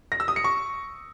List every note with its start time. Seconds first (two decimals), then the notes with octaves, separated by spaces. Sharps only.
0.12 A#6
0.20 E6
0.28 D#6
0.36 C#7
0.44 C#6